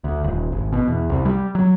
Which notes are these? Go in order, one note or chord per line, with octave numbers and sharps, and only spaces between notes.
D2
D#1
G#1
B2
E2
C2
G3
F#3